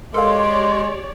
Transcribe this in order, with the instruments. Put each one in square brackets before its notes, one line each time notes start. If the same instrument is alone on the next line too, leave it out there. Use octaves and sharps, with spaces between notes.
[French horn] G#3 [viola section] G4 C#5 D5 [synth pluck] A4 A#4 F5 [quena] C6